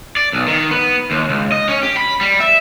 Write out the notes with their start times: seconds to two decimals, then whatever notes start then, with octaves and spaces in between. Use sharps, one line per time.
0.17 D5
0.33 B1
0.48 D#3
0.71 B3
1.11 D#2
1.30 C#2
1.52 D#5
1.68 C#4
1.83 G4
1.97 B5
2.21 G3
2.40 E5